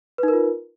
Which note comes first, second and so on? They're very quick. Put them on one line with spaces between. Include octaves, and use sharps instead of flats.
B4 D#4 A#4 F4